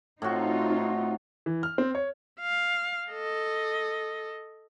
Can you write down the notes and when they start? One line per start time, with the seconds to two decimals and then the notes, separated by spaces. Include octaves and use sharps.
0.22 A2 C4 D#4 F4 F#4
1.46 E3
1.63 F6
1.78 C4
1.95 C#5
2.40 F5
3.10 A4 D#5